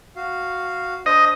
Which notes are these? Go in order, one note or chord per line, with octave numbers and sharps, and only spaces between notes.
F#4 F5
D4 C5 D#5